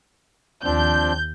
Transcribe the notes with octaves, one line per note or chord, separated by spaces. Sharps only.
D#2 F3 C4 D4 G6